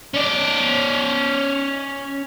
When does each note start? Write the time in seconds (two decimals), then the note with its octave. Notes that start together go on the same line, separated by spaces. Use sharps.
0.14 C#4 D5